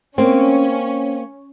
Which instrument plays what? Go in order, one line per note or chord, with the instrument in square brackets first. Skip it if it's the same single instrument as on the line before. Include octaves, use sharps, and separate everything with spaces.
[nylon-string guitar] A#3 C4 [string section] C#4